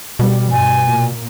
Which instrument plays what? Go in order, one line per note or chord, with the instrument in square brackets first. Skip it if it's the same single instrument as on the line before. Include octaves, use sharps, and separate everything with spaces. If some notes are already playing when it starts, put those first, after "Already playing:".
[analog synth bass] B2 [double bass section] G3
[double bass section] G2 [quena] G#5
[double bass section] A#2